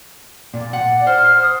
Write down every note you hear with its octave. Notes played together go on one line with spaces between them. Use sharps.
A#2 D5
F#5
C5 F6
D#6